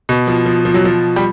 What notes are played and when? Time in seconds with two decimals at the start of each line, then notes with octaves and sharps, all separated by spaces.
0.09 B2
0.27 F3
0.46 F3
0.65 F3
0.74 F#3
0.84 F3
1.16 G3